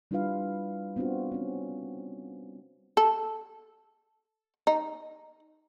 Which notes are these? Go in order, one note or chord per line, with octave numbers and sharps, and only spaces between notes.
G3 D4 E4 F4 B4 F5
B3 C4 D4 F4 F#4
C4 C#4
A4
D#4